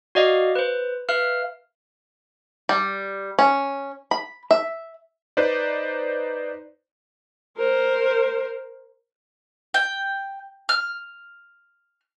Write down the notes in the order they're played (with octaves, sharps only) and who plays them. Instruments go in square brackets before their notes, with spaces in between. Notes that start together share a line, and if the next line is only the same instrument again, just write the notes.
[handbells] F#4 D5 D#5 F5 D6
B4 C5
B4 E5 F5 F6
[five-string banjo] G3
C#4
B5
E5
[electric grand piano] D#4 B4 C5 D5
[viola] A#4 C5
[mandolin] G5
F6